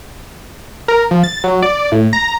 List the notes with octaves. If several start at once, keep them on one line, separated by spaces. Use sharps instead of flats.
A#4
F3
A6
F#3
D5
A2
A#5